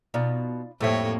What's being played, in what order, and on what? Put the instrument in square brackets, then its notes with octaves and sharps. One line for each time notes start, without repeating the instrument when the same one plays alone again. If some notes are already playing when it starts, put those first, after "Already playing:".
[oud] B2 [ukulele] D#4 F4 D5
[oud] F2 G3 [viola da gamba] A2 A#3 C#5 [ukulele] A4 C5 E5